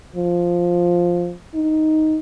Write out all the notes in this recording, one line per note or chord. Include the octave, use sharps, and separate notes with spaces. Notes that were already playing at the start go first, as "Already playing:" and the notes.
F3
D#4